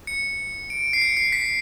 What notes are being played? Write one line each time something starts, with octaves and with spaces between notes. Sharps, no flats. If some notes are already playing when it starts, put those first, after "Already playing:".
C#7
D7
C7
C#7
C7
B6